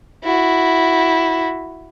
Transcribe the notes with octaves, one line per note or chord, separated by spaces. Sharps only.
E4 F#4